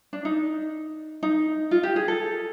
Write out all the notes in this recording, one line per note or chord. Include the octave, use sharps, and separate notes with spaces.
D4
D#4
D#4
F4
G4
G#4
A4